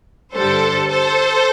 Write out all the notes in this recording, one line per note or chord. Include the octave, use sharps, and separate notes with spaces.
G2 D3 G3 D4 A4 C5
A4 C5